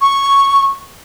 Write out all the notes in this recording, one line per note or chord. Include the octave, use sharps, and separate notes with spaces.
C#6